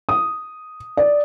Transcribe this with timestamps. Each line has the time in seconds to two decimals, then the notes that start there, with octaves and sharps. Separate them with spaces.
0.09 D#6
0.97 D5